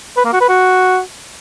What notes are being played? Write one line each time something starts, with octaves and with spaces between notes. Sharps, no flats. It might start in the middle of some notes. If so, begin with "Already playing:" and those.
B4
A#3
F#4
B4
F#4